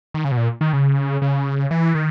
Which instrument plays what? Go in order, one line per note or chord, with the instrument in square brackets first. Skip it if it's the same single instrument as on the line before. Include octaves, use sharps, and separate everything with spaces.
[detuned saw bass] D#3
C#3
B2
A#2
D#3
C#3
C#3
E3
D#3